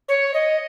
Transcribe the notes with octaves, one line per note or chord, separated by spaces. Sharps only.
C#5
D#5